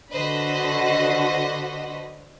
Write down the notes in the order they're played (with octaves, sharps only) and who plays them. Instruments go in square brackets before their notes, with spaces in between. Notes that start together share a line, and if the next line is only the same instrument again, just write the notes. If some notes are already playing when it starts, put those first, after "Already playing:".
[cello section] D3 F#4 [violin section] B4 C5 D#5